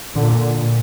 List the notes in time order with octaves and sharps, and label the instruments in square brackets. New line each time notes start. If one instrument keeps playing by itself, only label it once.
[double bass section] A#2 D3